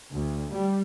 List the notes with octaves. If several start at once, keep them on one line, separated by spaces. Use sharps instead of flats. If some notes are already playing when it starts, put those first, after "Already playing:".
D2
G3